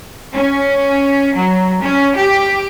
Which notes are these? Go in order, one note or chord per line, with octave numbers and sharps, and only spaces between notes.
C#4
F#3
C#4
G4